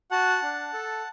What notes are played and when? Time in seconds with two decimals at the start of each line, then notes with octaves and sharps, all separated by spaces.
0.11 F#4 F#5 A5
0.42 D4
0.73 A4